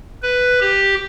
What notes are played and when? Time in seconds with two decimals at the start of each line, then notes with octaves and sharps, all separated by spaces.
0.22 B4
0.61 G4